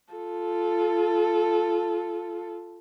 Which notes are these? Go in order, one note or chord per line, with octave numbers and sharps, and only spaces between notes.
F4 A4